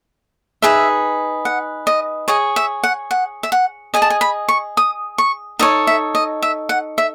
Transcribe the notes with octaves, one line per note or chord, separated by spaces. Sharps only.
D#4 G#4 B4 E5
F#5
D#5
G#4 C#5 D#5
E5
F#5
F#5
E5
F#5
G#4 D#5 G#5
A5
G#5
B5
C#6
D#6
C#6
D#4 A4 C#5 D#5
E5
D#5
E5
F#5
E5